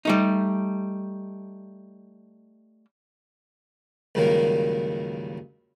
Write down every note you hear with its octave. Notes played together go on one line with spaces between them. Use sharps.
G3 A3 D#4
C#2 G2 D#3 F#3 A#3